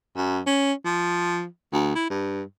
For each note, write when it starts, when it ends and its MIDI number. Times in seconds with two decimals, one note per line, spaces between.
0.16 0.40 42
0.46 0.73 61
0.85 1.45 53
1.73 1.91 38
1.95 2.06 64
2.10 2.42 43